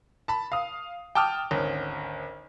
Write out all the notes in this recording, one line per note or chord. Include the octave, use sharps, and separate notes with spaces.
A5 B5
F5 D#6
G5 A5 D6 D#6 F6
G#1 D2 C#4